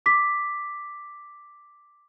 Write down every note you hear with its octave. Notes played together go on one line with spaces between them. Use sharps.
D6 B6